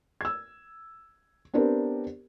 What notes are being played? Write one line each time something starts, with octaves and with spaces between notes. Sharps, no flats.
E6 G#6
B3 C4 D4 G4 A#4 C5